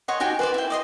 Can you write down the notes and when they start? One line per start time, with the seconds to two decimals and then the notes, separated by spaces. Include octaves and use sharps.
0.08 C#5 D#5 F#5 C6
0.20 D#4 F#4 G4 G#5
0.39 B4 C5 D5
0.54 E4 G5
0.70 D5 D#5 C6